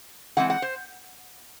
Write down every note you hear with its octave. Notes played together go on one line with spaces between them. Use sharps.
E3 G#3 C4 F#5
F#5
C5